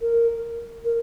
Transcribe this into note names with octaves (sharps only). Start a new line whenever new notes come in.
A#4
A#4